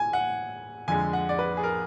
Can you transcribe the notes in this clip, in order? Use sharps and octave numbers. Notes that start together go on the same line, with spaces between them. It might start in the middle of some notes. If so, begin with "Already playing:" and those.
Already playing: G#5
F#5
F2 D3 G#3 G#5
F#5
D5
B4
G#4
A#4